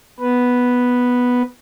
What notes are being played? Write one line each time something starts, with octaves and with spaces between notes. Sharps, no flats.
B3 B4